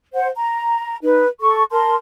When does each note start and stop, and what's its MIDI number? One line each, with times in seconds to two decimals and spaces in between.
0.14 0.28 72
0.14 0.28 78
0.36 0.97 82
1.03 1.25 63
1.03 1.25 71
1.40 1.63 69
1.40 1.63 85
1.71 1.94 70
1.71 1.94 81
1.71 1.94 84